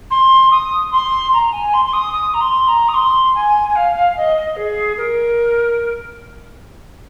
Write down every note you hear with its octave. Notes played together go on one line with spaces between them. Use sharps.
C6
D#6
C6
A#5
G#5
C6
C6
D#6
D#6
A#5
C6
A#5
D#6
C6
G#5
G#5
F5
F5
D#5
D#5
G#4
A#4